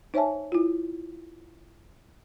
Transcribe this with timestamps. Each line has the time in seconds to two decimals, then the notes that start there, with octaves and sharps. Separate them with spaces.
0.14 D#4 C5 C#5 E5 G#5 A5
0.52 E4 F4